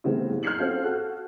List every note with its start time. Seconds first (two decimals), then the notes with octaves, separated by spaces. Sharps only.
0.04 C#3 E3 G3 A3 B3 C4
0.30 F#1
0.43 F6 G6 G#6 C7 C#7 F#7
0.59 C4 C#4 F4 F#4 A4
0.83 F#4 A4 F#6